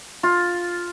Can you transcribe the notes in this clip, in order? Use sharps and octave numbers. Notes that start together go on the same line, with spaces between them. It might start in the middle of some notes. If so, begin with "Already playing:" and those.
F4